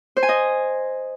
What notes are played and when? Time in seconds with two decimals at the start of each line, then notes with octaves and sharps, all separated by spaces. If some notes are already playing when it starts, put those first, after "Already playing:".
0.17 C5
0.23 G#5
0.29 D#5